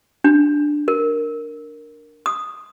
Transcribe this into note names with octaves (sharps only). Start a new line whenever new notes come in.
D4
A#4
D#6